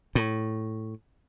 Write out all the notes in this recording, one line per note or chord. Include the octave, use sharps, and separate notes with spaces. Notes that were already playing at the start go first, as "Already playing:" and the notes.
A2